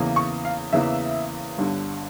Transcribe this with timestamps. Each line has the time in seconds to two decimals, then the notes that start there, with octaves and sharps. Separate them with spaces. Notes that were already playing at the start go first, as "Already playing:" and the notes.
Already playing: E2 C#3 E3 A#3
0.16 C#6
0.45 F5
0.73 E2 C#3 E3 A#3 E5
1.58 G1 G2 D3